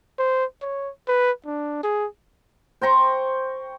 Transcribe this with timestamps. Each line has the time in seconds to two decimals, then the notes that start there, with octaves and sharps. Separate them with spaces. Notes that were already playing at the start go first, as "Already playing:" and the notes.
0.19 C5
0.62 C#5
1.08 B4
1.46 D4
1.83 G#4
2.81 C5 G5 A#5 C#6